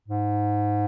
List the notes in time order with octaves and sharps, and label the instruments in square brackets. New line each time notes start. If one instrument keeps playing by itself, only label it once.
[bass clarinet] G#2